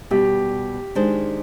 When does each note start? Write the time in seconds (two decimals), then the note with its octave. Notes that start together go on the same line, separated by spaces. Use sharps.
0.11 B2 G3 B3 G4
0.95 D#3 G#3 D4 G#4 C5